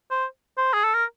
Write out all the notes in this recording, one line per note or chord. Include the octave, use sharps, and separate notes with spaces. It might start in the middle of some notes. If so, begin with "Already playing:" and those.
C5
C5
G#4
A4
A#4